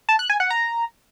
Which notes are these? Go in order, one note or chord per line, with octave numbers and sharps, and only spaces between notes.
A5
F#6
G#5
F#5
A#5